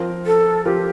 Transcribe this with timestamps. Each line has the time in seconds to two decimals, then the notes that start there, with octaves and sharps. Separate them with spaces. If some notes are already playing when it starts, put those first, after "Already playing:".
Already playing: F3 C4 F4 A#4
0.26 A4
0.65 F3 C4 F4 G4 A#4